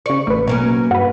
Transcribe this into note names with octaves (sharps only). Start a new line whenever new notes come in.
C#3 D5 C#6
A1 A3 B4
B2 F#3 A#3 C#4
G2 F#4 B4